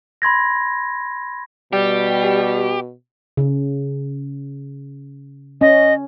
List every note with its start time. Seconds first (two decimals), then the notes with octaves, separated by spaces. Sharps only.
0.22 B5 C6 G#6 A#6
1.73 B2 G3 G4
3.37 C#3
5.61 C#4 D#5